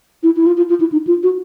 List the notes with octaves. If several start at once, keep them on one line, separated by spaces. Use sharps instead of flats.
E4
E4
F4
F4
F4
E4
D#4
F4
F#4